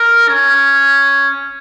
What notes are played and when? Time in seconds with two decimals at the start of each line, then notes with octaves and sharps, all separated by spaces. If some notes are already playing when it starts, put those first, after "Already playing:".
Already playing: A#4
0.29 C#4